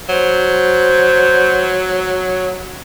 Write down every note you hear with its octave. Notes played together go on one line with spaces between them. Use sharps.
F#3 C5